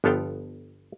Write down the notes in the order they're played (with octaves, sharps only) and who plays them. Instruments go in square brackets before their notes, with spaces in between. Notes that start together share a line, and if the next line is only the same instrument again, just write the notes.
[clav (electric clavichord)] G1 F3 B3 A4 F5 G5